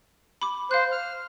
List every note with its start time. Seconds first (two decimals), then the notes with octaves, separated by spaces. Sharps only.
0.41 B5 D6
0.71 C5 F5 F#6
0.92 F6